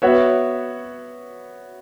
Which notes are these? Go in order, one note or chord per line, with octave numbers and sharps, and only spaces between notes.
B3 F#4 C#5 E5